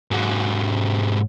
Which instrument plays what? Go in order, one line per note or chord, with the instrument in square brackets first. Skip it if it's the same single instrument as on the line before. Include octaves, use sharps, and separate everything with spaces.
[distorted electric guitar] G#2 F#3